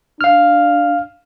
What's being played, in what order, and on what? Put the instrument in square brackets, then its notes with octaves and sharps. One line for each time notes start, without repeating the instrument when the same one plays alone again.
[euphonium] D4 [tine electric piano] F5 F6